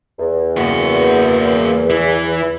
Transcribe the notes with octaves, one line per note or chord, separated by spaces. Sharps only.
E2
A#3 F#4
E3